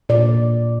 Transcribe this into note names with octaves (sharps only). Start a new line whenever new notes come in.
A#2 D5